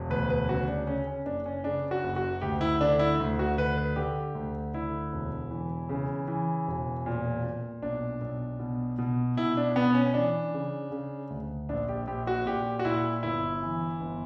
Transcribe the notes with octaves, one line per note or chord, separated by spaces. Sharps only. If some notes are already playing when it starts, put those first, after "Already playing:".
Already playing: E1
D2 B4
B4
C#3 F#4
D4
C#3 C#4
C#4
F#1 D4
C#4
C#3 D4
F#4
F#1
F#4
D2 G4
E4
D3 D4
E4
D2
F#4
D3 B4
B4
D3 G4
D2
D3 E4
E1
E3
C#3
E3
E1
A#2
A#2
B1 D4
B1
B2
B2
B2 E4
D4
B2 B3
C#4
E3 D4
C#3
C#3
D2
A#1 D4
G4
A#1 G4
F#4
A#2 G4
F#4
A#2 E4
G1 E4
E3
G1